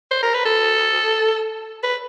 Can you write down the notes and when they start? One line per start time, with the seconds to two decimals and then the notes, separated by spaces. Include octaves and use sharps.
0.11 C5
0.23 A#4
0.34 B4
0.45 A4
1.83 B4